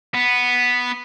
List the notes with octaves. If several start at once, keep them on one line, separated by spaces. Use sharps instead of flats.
B3